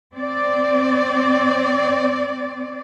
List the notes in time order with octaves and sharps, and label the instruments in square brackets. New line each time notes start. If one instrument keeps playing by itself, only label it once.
[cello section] C4 D5